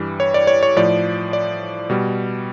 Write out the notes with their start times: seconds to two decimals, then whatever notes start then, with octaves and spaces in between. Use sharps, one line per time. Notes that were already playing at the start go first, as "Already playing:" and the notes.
Already playing: G2 E3 G3
0.20 C#5
0.34 D5
0.47 C#5
0.63 C#5
0.76 A2 F3 D5
1.33 D5
1.90 B2 G3